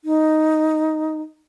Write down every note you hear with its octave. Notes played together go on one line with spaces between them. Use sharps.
D#4